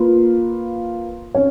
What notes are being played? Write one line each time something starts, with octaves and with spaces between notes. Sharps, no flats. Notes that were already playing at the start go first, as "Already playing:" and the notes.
Already playing: A#3 F4 B4
C#4 C#5